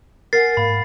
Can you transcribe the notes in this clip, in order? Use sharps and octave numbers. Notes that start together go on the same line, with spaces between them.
A#4 F#5 G#5 A6 C7
G#2 A#3 B5